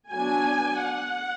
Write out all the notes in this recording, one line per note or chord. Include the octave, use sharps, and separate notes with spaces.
F#3 B3 D4 G#5
F#5